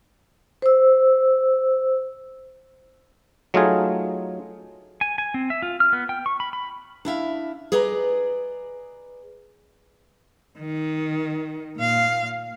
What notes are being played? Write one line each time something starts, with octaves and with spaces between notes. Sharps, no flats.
C5 E6
F#3 A3 D#4 F4 G#4
G#5
G#5
C4
E5
F4
F6
B3
G5
C#6
B5
B5
D4 E4 E5 F5
G#4 B4 D5 D#5 A#5
D#3
A#2 F5